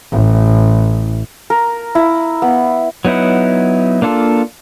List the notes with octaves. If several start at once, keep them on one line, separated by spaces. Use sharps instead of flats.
A1
A#4
E4
B3
F#3 B3 D#4 E4 F#5
A#3 D4 F4 A4